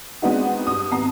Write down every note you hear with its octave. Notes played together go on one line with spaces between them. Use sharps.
G#3 B3 C4 D4 D#4 F#4
G2 D#6
G#1 B3 A5 A#5 C7